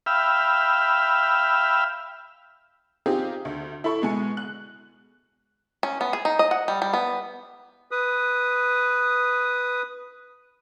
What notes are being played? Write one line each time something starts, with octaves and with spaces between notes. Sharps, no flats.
E5 F5 G5 B5 E6 F6
C4 D#4 F4 G4 G#4
D2
E4 A4 B5 C#6
B2 G#3 G#5 C#7
F#6
C#4
B3
G#4
D#4
D#5
F#5
G3
G3
B3
B4 D#6